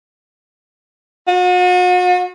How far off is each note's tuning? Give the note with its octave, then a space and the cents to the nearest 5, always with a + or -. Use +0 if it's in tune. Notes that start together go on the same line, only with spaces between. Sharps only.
F#4 -40